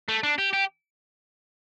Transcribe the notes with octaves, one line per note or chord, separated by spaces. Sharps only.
A3
D4
G4
G4